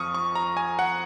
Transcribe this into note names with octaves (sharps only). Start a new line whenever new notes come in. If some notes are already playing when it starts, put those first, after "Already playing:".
Already playing: F2 F3 C#6 D#6 F6
C#6
A#5
G#5
F#5